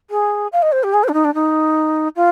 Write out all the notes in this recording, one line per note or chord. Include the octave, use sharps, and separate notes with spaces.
G#4
F5
D#5
C5
G4
G#4
C5
D4
D#4
D4
D#4
F4